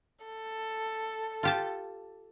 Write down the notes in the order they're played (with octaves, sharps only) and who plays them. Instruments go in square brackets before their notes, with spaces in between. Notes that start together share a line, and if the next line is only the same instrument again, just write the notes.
[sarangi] A4
[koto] F4 G4 A5